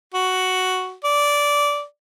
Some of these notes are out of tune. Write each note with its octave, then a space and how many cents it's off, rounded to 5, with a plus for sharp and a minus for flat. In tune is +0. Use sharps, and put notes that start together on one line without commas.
F#4 +5
D5 -15